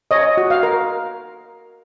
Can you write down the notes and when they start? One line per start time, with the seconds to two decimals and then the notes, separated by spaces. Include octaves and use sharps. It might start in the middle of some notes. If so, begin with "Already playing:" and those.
0.11 C#5 D#5
0.37 F#4
0.50 F5
0.63 A#4